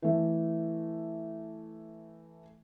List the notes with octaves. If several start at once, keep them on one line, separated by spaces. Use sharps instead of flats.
E3 A3